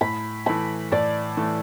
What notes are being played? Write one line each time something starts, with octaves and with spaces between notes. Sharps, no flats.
A2 B5
E3 A3 B5
A2 D5
E3 A3